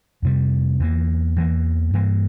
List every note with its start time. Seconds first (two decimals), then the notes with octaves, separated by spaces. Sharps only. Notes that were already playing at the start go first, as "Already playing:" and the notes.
0.22 F2 C3 G3
0.80 E2 E3 A#3
1.36 E2 E3 A#3
1.93 G2 E3 A#3